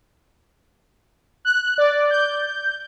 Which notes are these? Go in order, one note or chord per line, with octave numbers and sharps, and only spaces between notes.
F#6
D5
G6